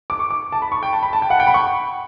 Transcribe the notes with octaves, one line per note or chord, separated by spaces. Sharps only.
D6
C#6
D6
A5
B5
C#6
G5
A5
B5
A5
G5
F#5
G5
B5
C#6